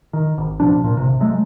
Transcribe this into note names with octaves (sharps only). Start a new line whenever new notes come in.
D#3
G#1
D1 B2 F3 D4
A#2
G#1 C3
F#3 G#3 A3